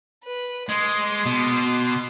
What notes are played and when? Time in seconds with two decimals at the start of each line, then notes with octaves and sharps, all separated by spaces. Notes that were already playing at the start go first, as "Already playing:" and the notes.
0.25 B4
0.69 G#3 C6 D6
1.26 B2